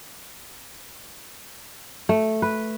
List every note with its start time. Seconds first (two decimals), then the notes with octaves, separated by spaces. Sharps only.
2.09 A3
2.42 B4